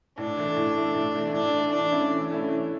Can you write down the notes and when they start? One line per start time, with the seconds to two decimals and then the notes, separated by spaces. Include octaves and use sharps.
0.18 A2 D4
0.37 E3 A3
0.56 A2
0.75 E3 A3
0.94 A2
1.14 E3 A3
1.33 A2 D4
1.53 E3 A3
1.72 E3 D4
1.92 A3 C#4 E4
2.10 E3
2.30 A3 C#4 E4
2.49 E3